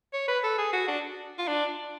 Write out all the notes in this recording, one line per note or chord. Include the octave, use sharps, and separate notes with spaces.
C#5
B4
A4
G#4
F#4
D4
F4
D4